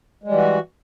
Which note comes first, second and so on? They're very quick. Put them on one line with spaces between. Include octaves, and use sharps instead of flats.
G#3 G3 E3 F#4